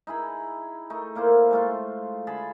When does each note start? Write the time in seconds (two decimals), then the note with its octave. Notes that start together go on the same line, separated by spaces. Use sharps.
0.07 D#4 E4 G#4 B5
0.90 A3 D#4
1.15 A#2 A#3 E4 C5
1.51 G#3 A3 F4
2.27 D3 G#4 A5 B5